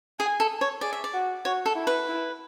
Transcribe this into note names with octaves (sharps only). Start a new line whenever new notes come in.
G#4 G#5
A4
C#5
G#4 D5
E5
D5
F#4
F#4 C#5
A4
E4
B4
E4